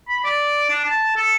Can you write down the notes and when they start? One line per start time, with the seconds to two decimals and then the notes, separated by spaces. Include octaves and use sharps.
0.08 B5
0.24 D5
0.70 D4
0.85 A5
1.17 A4